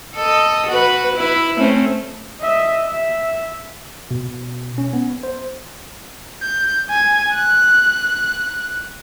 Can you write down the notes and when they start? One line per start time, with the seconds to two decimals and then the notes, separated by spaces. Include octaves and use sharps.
0.15 A4 D#5
0.66 F#4 B4
1.16 E4 B4
1.57 A3 C4 C#4
2.40 D#5 E5
2.87 E5
4.11 B2
4.78 C#4
4.93 B3
5.23 C5
6.42 G6
6.90 G#5
7.35 F#6